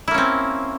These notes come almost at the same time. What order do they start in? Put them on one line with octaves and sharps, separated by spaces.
E4 A#3 C#4 C4